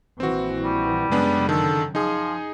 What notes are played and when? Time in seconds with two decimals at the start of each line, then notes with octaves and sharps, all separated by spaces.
0.20 A#1 E3 C4 F#4
0.64 G3
1.11 F#2 C#3 G#3 B3 D4
1.49 D3 D#3 A4
1.95 F3 D#4 G#4